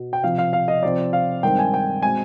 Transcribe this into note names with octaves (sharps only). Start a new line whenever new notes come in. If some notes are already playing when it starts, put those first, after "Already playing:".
Already playing: B2
G5
C3 F3 C4 F5
F5
F5
D#5
C3 F3 C4 D5
F5
G2 D#3 G#3 C4 G5
G#5
G5
B2 G#3 C4 G#5